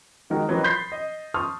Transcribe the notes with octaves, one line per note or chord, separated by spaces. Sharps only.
D#3 G3 G#3 F#4 A#4
E3 F#3 C4 A#4 B4 D#5
B5 C6 G6 A6 B6 C7
D#5
A5 C6 C#6 D#6 F6